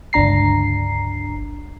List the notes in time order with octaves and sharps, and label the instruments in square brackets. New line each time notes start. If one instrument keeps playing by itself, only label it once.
[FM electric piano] G1 C#2 D4 A#5 C7